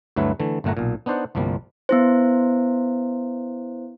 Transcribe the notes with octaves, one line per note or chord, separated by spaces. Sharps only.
D2 G2 F#3 A3 E4 B4
D3 E3 A3
G1 A#2 A3 F#5 A#5
B1 A#2
B3 D4 D#4 C5 D5 F#5
G1 C2 F3 G3 A#3
B3 E4 C5